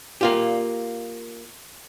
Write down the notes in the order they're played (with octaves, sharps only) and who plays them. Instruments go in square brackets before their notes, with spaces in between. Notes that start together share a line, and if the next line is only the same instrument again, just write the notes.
[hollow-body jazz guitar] A#3 F4 G4